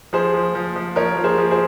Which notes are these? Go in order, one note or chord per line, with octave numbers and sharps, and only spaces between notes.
F3 G#4 C5
F3
F3
F3
F3 A#4 C#5
F3
G#4 C5
F3
G#4 C5